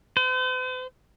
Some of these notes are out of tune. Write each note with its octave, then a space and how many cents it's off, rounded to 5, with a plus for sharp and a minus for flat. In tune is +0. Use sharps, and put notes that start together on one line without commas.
C5 -45